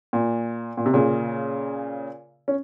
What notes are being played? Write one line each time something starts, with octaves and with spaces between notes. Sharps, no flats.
A#2
A#2
C3
A#2 C#3
C#4